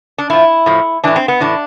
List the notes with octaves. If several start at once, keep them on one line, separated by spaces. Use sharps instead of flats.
D4
A2 F3 E4
A2 F3
A2 E3 D4
C4
B3
A2 E3 D4